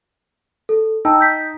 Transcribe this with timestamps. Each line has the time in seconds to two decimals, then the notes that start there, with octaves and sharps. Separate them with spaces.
0.69 A4
1.05 D#4 G5 A5 E6
1.21 G6 B6